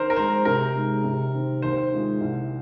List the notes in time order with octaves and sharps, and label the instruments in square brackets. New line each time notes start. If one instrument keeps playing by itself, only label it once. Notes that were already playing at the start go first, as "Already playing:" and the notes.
Already playing: [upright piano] D#3 [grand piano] A#4 C5
[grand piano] A#4
[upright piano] G#3 C4 [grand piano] C5
[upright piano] C3 [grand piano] A#4
[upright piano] G#3 D#4
C3
D#3 C4
[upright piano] D#2 [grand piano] C5
[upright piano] D#3 G#3 F4 G#4
C2